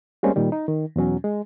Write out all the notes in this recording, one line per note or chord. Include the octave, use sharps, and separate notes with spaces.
G3 G#3 A#3 C4 C#4
A#2 D#3 G3
D#4
D#3
E2 B2 F#3 C#4
G#3